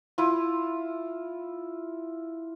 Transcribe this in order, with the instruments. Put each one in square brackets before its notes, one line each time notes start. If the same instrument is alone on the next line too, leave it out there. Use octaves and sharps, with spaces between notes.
[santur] E4 F4